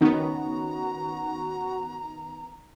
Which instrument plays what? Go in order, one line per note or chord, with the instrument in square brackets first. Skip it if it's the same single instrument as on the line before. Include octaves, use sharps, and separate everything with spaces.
[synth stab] D#3 B3 [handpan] C#4 D#4 [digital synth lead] F#4 [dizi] A#5